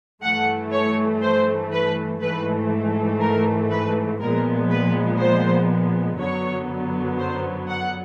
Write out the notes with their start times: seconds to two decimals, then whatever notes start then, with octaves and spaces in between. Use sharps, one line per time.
0.22 G2 E3 A3 F#5
0.72 C#5
1.22 C5
1.72 B4
2.21 G#2 E3 A3 B4
3.21 A#4
3.70 B4
4.21 A#2 F3 G#3 B3 A#4
4.70 B4
5.20 C5
6.19 F#2 D3 F#3 B3 C#5
7.18 C5
7.69 F#5